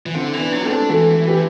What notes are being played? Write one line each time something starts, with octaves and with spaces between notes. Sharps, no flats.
E3
D3 C4 E4
E3
B3 D4
F#3
D4
A3 C4
D4
E3 F#4 A4
G4 B4